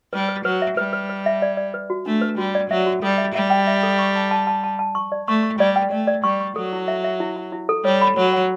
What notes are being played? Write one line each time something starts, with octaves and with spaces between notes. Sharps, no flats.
G3 B4
B4
F#3 B4
E5
G3 B4
B4
B4
E5
D5
D5
B4
F#4
A3 D4
B4
G3 F#4
D5
F#3 E5
F#4
G3 A4
E5
G3 E5
G5
E5
A4
C#6
A5
A5
A5
A5
A5
C#6
D5
A3 C#6
C#6
G3 D5
G5
A3 D5
D5
G3 C#6
C#6
F#3 A4
E4
E5
E5
E4
E4
E4
A4
G3 C#5
B5
F#3 C#5
F#5